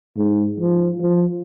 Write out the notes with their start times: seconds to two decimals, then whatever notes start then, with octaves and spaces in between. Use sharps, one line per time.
0.17 G#2
0.60 F3
1.01 F3